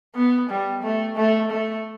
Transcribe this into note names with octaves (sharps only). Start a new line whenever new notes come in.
B3
G3
A3
A3
A3